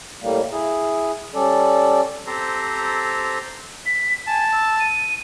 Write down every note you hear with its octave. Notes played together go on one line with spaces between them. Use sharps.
A2 G3 A#3
E4 G#4
G3 C#4 A4 D5
C4 G4 A4 C5 A#5
B6
G#5 A5
E6
D#7